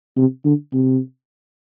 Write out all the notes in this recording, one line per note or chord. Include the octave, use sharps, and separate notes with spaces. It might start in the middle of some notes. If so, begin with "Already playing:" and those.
C3
D3
C3